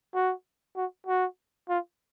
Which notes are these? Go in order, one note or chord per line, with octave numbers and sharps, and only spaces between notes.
F#4
F#4
F#4
F4